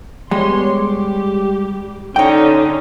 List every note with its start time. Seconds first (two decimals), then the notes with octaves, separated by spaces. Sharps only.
0.31 G3 G#3 B3 C#5 C6
0.73 G4
2.16 D3 C#4 D#4 C#5 G5